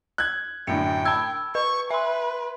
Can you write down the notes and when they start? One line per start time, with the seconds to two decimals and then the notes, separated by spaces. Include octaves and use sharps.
0.18 F#6 G#6
0.67 F#2 A2 D3 G5 C#7
1.05 A5 B5 E6 G#6
1.55 B4 C#6
1.91 B4 E5 C6